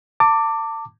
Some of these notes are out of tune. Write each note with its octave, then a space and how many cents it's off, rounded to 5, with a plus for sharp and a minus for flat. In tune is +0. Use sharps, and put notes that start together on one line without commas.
A5 +30 D6 +0